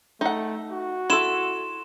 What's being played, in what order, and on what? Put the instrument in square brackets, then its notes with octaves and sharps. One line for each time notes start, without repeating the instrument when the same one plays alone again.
[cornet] A3 [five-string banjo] D#4 F#5
[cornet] F#4
[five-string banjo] E4 A4 [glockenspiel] C6 E7